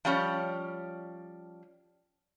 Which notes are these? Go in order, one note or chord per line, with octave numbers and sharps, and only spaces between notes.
F3 G3 C#4 C#5